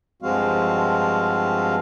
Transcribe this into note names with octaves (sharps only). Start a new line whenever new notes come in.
G2 F3 G#3 C4 F#4 F5